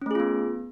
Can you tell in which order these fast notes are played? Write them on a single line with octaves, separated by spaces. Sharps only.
C#4 A3 G#4 F4 B3